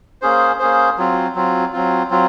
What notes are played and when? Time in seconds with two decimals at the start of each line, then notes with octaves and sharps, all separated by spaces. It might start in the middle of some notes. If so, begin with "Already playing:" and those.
0.22 A#3 C#4 G#4 C5
0.59 A#3 C#4 G#4 C5
0.98 F#3 C4 F4
1.35 F#3 C4 F4
1.73 F#3 C4 F4
2.10 F#3 C4 F4